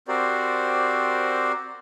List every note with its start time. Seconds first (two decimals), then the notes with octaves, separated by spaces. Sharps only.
0.08 C4 F#4 G4 A#4 C5 D5